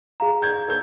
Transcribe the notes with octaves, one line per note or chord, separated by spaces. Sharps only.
G#4 F5 A#5
G6 G#6
A4 G6